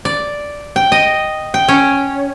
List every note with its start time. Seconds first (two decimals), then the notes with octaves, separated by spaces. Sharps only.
0.05 D5
0.76 G5
0.92 D#5
1.54 G5
1.68 C#4